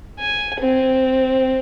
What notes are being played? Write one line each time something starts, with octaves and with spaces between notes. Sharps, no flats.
G#5
C4